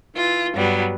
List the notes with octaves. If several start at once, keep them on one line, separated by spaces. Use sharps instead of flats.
E3 F4
G2 F#3 G3 B3